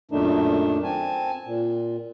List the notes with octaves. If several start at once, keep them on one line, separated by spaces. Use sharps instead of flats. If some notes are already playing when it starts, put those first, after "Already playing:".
F#2 A#2 D#3 A3 D4 D#4
C4 G#5 A5
A#2